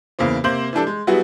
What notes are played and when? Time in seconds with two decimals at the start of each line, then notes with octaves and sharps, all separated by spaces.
0.19 E2 C#3 A#3 C4
0.44 C3 A#3 C5 G6 F#7
0.73 E3 G3 D4 A4
0.87 G#3
1.07 F#3 G3 B3 E4 F#4 G#4